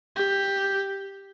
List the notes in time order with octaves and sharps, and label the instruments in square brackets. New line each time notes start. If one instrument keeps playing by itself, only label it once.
[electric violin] G4